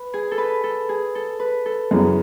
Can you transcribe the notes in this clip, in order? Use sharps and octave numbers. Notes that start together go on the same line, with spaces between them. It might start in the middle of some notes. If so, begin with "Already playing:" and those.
Already playing: B4
G#4
A4
B4
A4
G#4
A4
B4
A4
F#2 C#3 E3 B3 G#4